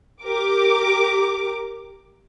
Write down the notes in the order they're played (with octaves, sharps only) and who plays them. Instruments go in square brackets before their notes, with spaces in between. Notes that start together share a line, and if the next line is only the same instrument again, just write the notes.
[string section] G4 A#4 D6